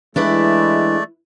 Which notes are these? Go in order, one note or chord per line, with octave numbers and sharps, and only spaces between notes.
E3 G#3 A3 D4 E4 B4 D5